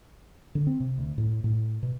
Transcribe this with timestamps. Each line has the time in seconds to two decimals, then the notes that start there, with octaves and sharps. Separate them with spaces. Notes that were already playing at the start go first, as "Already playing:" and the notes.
0.55 D3
0.67 C4
0.80 C3
0.98 D2
1.18 A2
1.44 A2
1.83 B2